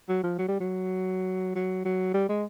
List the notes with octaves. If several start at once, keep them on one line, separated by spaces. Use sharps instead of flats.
F#3
F3
F#3
G3
F#3
F#3
F#3
G3
G#3